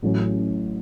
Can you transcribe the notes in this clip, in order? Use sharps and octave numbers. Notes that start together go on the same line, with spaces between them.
A1 A2 F#3 C#4